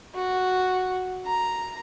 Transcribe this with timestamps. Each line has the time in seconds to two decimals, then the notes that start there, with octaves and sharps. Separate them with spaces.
0.15 F#4
1.25 A#5